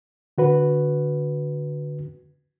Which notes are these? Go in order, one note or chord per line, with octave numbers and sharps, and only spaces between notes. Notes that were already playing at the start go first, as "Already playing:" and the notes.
D3 F#4 B4